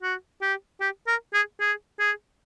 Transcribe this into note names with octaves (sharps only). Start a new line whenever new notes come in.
F#4
G4
G4
A#4
G#4
G#4
G#4